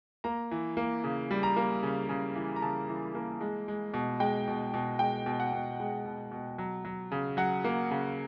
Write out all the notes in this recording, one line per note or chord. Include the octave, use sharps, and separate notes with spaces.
A#3 A#5
E3
A#3
C#3
G3
A#5
A#3
C#3
C#3
E3
A#5
C#3 A5
E3
A#3
G#3
G#3
B2
G#3 G5
B2
B2
G#3 G5
B2
F#5
B2
G#3
B2
B2
F#3
F#3
C#3
F#3 F#5
A#3
C#3